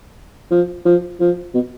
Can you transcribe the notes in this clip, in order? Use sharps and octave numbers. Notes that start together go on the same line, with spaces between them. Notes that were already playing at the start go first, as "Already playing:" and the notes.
F3
F3
F3
B2